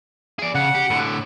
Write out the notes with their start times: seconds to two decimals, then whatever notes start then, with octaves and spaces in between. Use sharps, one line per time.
0.39 G#4 D5
0.55 C#3 F#5
0.75 G4
0.90 A2 D3